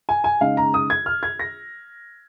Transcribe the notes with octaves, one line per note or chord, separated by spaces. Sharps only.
G#5
G#5
C#3 G#3 D#4 F5
A#5
D#6
G#6
F6
G#6
A#6